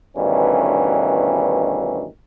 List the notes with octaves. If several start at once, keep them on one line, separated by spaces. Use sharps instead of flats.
D2 G2 B2 D#3 E3 C#4